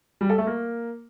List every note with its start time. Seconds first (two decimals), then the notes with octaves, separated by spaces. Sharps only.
0.21 G3
0.29 A4
0.38 A3
0.47 A#3